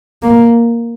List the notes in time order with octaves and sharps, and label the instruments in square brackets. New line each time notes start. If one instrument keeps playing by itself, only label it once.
[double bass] A#3